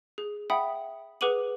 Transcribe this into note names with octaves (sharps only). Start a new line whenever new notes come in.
G#4
E5 F#5 G5 B5 D#6
G#4 B4 F#5 D6 D#7 F#7